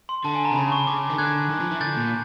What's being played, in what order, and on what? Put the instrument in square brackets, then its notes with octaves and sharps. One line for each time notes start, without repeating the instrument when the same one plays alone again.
[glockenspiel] C6
[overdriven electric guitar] D3 [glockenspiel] A5
[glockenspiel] G#5
A#5
[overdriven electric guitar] C3
[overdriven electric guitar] C#3 [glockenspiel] B5
[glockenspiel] C#6
[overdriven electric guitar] C#3 [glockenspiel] D6
[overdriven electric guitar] D#3
[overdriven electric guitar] D3 [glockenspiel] F#6 G#6
[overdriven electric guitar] D#3
F3
E3
[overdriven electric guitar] D3 [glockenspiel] G6 A6
[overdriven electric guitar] A#2